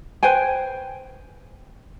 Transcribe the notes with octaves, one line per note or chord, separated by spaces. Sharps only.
B4 C5 G5 G#5